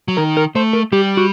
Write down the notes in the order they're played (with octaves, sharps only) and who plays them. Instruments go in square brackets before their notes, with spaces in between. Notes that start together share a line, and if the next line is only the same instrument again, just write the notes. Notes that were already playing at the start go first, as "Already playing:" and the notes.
[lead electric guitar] F#3
[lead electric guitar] D#3 [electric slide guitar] A#4
[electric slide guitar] A#4
[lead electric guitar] A3 [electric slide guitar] C5
[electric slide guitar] A#4
[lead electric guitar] G3 [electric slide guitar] G4
[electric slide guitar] F#4